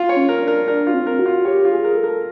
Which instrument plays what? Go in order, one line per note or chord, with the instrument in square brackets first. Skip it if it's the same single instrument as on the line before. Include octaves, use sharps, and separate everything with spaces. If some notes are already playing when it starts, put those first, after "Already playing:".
Already playing: [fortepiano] F4
C#5
[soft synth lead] C#4
[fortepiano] A#4
[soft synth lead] D4
[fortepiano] A#4
[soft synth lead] D4 [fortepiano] A#4
[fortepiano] F4
[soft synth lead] C4
[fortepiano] A#4
[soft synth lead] F#4
[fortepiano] F4
[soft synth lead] G4 [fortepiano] C#5
[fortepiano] F4
[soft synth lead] G#4
[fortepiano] A#4
[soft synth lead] A4
[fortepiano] A#4